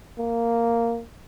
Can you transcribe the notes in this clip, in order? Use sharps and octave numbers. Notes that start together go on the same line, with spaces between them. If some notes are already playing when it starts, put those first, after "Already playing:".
A#3